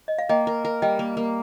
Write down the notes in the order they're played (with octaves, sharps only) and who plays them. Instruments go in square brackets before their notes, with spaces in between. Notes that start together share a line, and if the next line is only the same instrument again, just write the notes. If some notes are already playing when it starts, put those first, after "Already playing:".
[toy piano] D#5
F5
[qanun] A#3 [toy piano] D#5 G5
[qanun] A#4
A#4
[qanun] G3 [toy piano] D#5 G5
[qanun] A#3
A#3